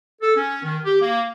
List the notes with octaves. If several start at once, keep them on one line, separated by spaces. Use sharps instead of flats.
A4
C#4
D#3
G4
A#3